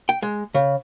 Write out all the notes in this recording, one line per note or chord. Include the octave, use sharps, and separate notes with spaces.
G5
G#3
C#3